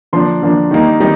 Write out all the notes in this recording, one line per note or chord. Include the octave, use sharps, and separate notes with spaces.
D3 F3 A#3 D4 C6
D3 F3 A#3 D4
D#3 G3 A#3 D#4
D#3 G3 D#4